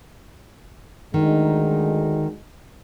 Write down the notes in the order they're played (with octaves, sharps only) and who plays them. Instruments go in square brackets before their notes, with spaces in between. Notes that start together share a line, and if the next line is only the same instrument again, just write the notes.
[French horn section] D2 G#3 D#4 [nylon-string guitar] D#3